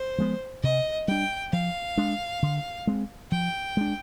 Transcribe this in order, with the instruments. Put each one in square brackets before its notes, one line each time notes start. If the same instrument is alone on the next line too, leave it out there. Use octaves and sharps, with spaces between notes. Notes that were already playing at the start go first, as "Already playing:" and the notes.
Already playing: [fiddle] C5
[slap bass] F3 G#3 B3
[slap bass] C3 [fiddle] D#5
[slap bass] G3 D4 [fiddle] G5
[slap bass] F3 [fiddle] F5
[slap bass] G#3 D4
D3
G#3 C4
[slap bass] F3 [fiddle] G5
[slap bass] G#3 D4